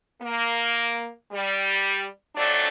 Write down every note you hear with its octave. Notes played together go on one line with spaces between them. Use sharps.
A#3
G3
F2 F#3 A3 D4 D5